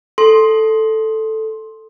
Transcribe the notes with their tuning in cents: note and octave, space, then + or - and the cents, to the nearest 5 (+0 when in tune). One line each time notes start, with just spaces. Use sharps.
A4 +0 C6 +10